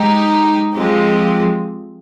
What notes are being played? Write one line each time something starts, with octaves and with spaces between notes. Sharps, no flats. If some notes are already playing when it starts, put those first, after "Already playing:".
Already playing: G#3 D#4 G4
F3 G#3 C4 G4